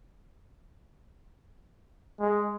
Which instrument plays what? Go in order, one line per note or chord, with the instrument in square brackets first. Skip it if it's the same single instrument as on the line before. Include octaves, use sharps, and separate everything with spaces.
[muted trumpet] G#3